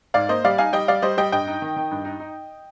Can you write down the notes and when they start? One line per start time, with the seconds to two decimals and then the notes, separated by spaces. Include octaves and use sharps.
0.14 G#2 D5 F5
0.29 A#3 C5 D#5
0.44 G3 D5 F5
0.58 D#4 F5 G#5
0.73 G3 D#5 G5
0.88 G3 D5 F5
1.02 G3 C5 D#5
1.17 G3 D#5 G5
1.32 G2 D#5 G5
1.47 D#4
1.62 D#3
1.76 D#3
1.91 G2
2.05 D#4
2.20 D#4